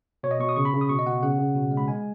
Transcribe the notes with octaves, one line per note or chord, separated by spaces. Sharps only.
B2 C#5
D#5
B2 C#6
D#6
C#3 C#6
B5
C#3
D#6
B2 C#6
D#5
B2 F#5
C#3 F#5
C#3
B2
G#3
B5
G#3 G#5